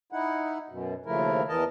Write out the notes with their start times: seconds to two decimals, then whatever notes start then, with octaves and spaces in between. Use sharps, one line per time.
0.12 D#4 E4 F#5
0.70 F#2 B2
1.06 D#2 C#3 F3 A3 E4 A#4
1.49 E2 E3 A#4 D#5 A5